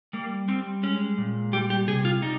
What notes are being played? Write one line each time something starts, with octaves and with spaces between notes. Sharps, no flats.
G3 A#3
G3 C4
G#3 C#4
A#2
G3 G4
G4
C3 G#4
F4
G3 D#4